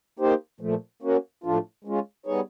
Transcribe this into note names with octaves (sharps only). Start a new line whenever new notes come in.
A#3 D#4 G4 C5
A#2 F3 A3
A#3 C#4 F#4
A2 F3 A3 D4 F4
G#3 C#4 F4
G3 B3 D#4 G#4 C#5